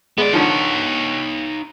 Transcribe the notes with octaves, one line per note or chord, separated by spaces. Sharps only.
G#3 B3 D5
D3 D#3 F3 D#4 C#5